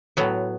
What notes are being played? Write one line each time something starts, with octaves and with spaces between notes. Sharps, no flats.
A2 F#3 B3